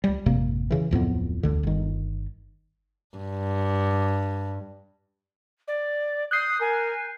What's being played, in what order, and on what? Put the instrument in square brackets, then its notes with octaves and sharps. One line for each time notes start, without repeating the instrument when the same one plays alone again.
[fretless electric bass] C#2 G3
G#1 F2 C3 A#3
C#3 E3
D1 F2 A2 B3
E1 D2 D3
G1 D#3
[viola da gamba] G2
[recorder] D5
[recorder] D#6 [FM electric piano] F#6 G6 C7
[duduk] A#4 [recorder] G#5